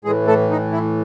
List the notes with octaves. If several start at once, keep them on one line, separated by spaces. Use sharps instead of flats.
A2 E3 G#3 G#4
A3 A4
D#4
E4